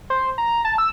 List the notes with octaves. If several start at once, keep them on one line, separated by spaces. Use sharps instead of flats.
C5
A#5
A5
E6